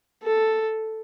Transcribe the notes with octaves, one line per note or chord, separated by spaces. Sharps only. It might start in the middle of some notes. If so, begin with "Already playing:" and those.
A4